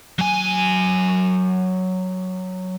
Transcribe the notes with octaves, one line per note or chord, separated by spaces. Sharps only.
F#3 G#5